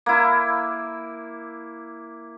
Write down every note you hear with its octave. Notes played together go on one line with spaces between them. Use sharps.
A#3 E4